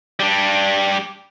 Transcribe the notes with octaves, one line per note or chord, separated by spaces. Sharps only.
G3 D4